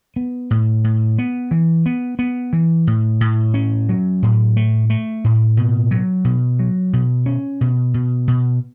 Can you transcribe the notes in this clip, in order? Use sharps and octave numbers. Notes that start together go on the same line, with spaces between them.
B3
A2
A2
B3
E3
B3
B3
E3
A2
A2
C#4
F#3
A2
A3
A3
A2
B2
F#3
B2
F#3
B2
C#4
B2
B2
B2